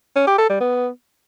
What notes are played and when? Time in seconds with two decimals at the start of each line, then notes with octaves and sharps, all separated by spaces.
0.16 C#4
0.27 G4
0.38 A4
0.49 G3
0.60 B3